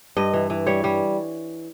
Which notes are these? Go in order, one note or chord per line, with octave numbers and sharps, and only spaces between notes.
G2 D#5
E3
E3
G3 C#5
G3